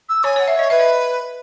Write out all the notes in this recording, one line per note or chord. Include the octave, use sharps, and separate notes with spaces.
E6
C#5 G#5
C#5 F#5
E5
C#5 D#5
B4 E5
D#5